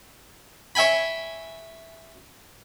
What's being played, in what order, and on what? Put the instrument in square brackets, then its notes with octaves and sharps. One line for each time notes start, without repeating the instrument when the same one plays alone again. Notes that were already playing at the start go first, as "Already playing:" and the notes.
[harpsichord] C#5 E5 G5 G#5 B5